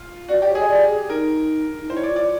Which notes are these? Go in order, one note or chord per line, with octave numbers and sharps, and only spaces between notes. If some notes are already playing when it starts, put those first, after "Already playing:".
Already playing: F4
F#4 D5
D5
G4
C#5
G#4 D#5
D5
G#4
D#4 A#4
D#4
E4 C5
C#5
D5
F4
D5